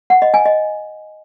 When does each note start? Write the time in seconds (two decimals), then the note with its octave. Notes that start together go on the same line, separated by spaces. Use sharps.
0.10 F#5
0.22 D#5
0.34 G#5
0.46 D#5